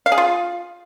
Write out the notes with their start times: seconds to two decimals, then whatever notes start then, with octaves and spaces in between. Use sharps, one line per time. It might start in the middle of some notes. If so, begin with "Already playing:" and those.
0.06 F5
0.12 G#4
0.18 F4